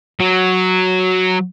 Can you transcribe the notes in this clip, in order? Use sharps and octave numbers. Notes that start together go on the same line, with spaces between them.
F#3